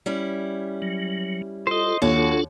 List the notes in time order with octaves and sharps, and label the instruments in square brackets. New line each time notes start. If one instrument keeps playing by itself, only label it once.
[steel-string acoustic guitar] G3 C#4 E4
[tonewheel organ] F#3
[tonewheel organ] F4 A4 [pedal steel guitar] C5 D#5
[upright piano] D#2 [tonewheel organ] D4 F4 A4 [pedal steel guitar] F#4 [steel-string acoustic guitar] C#5